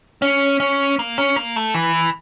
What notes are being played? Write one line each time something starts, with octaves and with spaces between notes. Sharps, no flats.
C#4
C#4
A#3
C#4
A#3
A3
E3